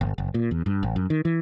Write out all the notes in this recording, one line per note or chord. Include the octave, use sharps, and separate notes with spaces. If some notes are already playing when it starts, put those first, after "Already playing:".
G1
F#1
A#2
E2
G2
A1
F#2
D#3
E3